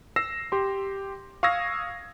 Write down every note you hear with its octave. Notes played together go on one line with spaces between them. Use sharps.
E6 A#6 C7 E7
G4 C6
F5 C#6 D#6 E6 G#6 A#6